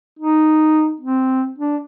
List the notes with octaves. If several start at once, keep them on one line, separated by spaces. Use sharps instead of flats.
D#4
C4
D4